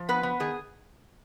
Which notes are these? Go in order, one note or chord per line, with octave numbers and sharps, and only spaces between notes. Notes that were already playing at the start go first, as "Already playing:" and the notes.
Already playing: F3
B3 B4
B3
D#3 G#4